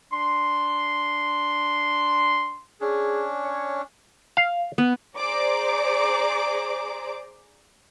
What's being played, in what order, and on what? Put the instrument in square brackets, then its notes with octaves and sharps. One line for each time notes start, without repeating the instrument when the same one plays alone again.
[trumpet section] D4 C6
[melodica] C#4 D4 [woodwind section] G#4
[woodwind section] C#5
[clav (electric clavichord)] F5
[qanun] B3
[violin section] G#4 C5 D5 A#5 D6